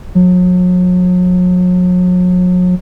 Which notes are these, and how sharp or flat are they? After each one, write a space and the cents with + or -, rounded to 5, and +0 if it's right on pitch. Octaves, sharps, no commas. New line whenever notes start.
F#3 -40